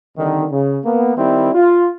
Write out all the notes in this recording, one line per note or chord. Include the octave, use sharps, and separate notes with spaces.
C2 D3 D#3
C#3
A#3 B3
D#3 G3 C4 E4
F4